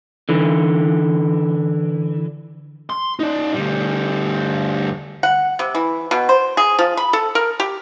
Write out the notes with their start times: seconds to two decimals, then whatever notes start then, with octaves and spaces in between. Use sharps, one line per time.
0.29 D3 E3
2.90 C6
3.19 D#4 D5
3.54 D2 G3
5.23 F#5
5.59 C3
5.75 E3
6.11 B2
6.29 C5
6.57 G#4
6.79 F3
6.97 B5
7.13 A4
7.35 A#4
7.60 G4